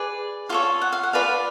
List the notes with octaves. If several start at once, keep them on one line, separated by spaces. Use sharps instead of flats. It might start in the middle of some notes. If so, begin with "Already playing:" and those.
Already playing: G#4 B4 D5
F4 A4 C#5 F5
F#5
F5
F#5
F4 B4 D5 F5 G#5